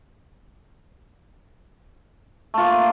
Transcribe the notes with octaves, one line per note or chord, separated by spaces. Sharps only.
A3 A#3 F4